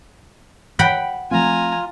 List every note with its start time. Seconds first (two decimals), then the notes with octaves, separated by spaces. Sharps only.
0.79 F#5 G5 B5
1.31 F3 A3 C4 F4 G#5 A#5